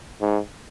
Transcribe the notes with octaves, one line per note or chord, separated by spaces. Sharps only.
G#2